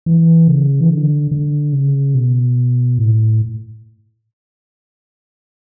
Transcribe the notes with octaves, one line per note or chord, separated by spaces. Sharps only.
E3
C#3
E3
D3
D3
C#3
B2
A2